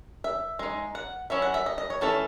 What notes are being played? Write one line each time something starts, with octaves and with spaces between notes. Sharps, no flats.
E5
G#3 D#4
F#5
F#3 C#4 E4 E5
F#5
E5
D#5
D#5
C#5
E3 A3 C#4 E4 A4